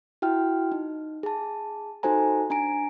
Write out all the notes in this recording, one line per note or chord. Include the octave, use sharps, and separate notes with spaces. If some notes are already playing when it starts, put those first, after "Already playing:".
E4 F#4 G5 F6
D#4
G#4 A5
D#4 F#4 A4 C5 G#5 A#5
D4 G#5 A#5 D7